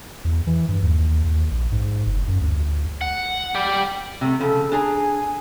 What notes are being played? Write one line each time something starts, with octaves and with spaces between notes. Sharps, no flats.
E2
E3
G2
D#2
D#2
A#1
G#2
F#1
F#2
D2
F#5
G4 D5
C3 A3
C#3 F3 A4
D4 G#4 G#5 A#5